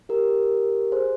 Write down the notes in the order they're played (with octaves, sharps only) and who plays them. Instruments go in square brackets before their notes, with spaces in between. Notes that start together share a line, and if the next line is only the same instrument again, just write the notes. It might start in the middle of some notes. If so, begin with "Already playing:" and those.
[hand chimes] G4 A#4
G#4 C5